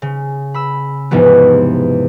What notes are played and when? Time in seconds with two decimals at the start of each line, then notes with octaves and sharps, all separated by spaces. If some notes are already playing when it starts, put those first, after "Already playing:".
0.02 C#3
0.54 B5 E6
1.11 E2 G#2 C3 F3 B3